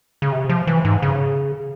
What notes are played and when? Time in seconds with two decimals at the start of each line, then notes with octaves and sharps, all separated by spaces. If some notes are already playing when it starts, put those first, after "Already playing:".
0.22 C#3
0.32 C3
0.49 F3
0.67 E3
0.85 G#2
1.02 C#3